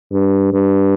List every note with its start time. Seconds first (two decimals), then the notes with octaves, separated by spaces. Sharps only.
0.12 G2
0.53 G2